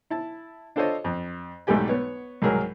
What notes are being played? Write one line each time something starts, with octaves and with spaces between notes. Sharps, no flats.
E4 A5
D4 F4 A4 C5 C#5 D#5
F2
B1 G#2 G3 A3 G4 G#5
B3 C#5
C2 G#2 F#3 G#4 A#4